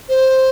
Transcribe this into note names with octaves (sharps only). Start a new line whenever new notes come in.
C5